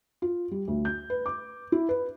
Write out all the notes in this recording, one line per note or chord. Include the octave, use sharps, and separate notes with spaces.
F4
G3
D2
G6
B4
D6
E4
B4